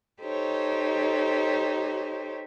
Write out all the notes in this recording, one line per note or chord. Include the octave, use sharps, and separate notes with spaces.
D#4 G4 A4 C5 C#5